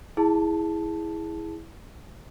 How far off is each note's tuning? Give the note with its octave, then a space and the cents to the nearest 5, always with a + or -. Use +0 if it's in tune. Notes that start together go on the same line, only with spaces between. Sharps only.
E4 -10 G#4 +0 A5 +0